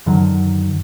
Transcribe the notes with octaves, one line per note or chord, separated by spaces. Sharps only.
F#2 D3 D#3 F#3